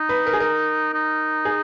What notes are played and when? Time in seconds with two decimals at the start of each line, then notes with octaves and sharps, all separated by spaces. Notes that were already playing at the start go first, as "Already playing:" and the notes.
Already playing: D#4
0.09 B4
0.27 A#4
0.33 G#4
0.40 A#4
0.94 D#4
1.45 G#4